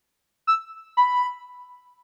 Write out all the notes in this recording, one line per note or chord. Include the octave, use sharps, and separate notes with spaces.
E6
B5